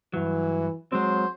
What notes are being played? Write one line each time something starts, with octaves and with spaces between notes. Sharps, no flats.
G2 E3 F#3
F#3 G#3 C4 C5